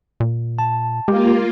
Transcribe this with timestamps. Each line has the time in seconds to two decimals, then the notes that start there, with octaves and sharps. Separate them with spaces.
0.20 A#2
0.59 A5
1.08 G#3 A#3 F4 G4